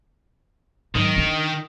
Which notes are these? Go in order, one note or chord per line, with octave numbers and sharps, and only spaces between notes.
G#2 D#3 F#3
C#3 D4